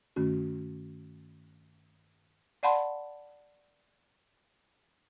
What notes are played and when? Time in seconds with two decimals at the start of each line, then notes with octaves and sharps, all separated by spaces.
0.16 G2 D#3 A3 C#4 F#4
2.63 D5 F5 F#5 A5 B5 C6